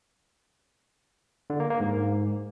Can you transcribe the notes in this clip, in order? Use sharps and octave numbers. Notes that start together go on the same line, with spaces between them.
D3
A#3
A#3
G#2